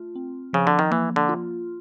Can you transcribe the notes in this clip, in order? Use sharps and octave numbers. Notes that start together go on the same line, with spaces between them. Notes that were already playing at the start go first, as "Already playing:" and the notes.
Already playing: A3 F4
C4
C#3 F3
D3
D#3
E3 A#3
D3
F4